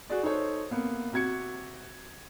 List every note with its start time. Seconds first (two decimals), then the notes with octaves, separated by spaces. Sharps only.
0.10 F#4 G#4 D5
0.23 D#4 A4 C5 C#5
0.71 C3 A#3 B3
1.12 C3 F#4 G#6 C#7